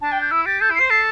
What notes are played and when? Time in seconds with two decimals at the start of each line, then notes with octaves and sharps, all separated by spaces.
0.02 D4 A5
0.12 G5
0.21 G6
0.31 E4 E6
0.46 G4 A6
0.60 A4 G6
0.71 E4
0.75 C5 C7
0.90 A4 C7